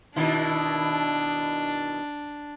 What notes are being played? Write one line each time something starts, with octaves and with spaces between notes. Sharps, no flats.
B2 D#3 D4 E4